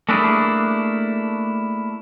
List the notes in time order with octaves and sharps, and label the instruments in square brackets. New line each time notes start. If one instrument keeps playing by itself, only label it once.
[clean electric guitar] A3 A#3 D4 E4 G#4